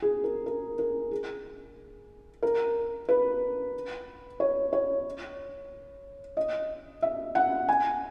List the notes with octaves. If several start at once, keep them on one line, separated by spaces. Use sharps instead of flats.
G#4
A#4
A#4
A#4
G#4
A#4
B4
C#5
C#5
D#5
E5
F#5
G#5